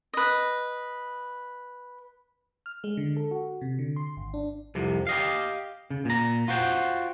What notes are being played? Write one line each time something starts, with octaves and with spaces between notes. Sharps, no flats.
B4 D#5
F6
G#3
D3
A4
F#4
C3
D3
C6
G#1
D4
C2 F2 C3
G4 D#5 F5
C#3
A#2 A#5
F4 F#4 C5 G5